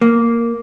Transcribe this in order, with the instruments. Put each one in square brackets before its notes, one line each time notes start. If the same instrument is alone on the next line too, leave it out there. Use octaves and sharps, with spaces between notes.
[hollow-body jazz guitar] A#3